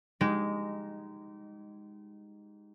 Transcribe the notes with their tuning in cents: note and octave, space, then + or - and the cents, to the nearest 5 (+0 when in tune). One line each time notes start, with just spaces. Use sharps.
G#3 -15 D#4 +0 G4 -35